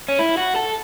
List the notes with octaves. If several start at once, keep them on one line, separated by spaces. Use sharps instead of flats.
C#4
E4
F#4
A4